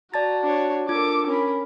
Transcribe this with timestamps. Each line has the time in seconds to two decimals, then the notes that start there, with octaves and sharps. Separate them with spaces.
0.14 F#4 D5 A5 A#5 A6
0.43 D4 C#5
0.89 D4 F4 A4 A#4 D6 G#6
1.27 C#4 A#4 B5